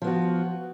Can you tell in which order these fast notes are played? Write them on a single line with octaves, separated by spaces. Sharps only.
F3 B3 F#4